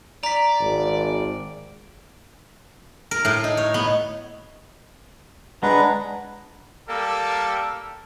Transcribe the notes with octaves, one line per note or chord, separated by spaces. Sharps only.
D5 A#5 B6
G#1
A#4
A2
D#4
C#5
B3
G#3 D4 B4 F#5 A#5
G3 A#3 A4